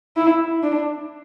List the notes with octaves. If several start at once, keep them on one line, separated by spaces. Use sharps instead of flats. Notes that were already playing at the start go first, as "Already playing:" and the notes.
E4
D4